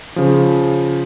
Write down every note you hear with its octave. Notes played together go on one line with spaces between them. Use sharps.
C#3 F3